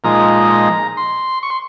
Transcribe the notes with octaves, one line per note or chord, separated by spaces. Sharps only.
A#2 F3 G#3 D#4 A#5
C6
C#6
C6